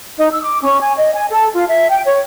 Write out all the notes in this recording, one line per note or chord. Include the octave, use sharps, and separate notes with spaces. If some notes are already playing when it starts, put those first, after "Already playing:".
D#4
E6
D6
C#4
G#5
D#5
G#5
A4
F4
E5
G5
C#5